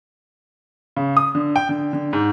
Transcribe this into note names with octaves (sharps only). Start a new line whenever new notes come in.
C#3
D#6
D3
G5
D3
D3
G#2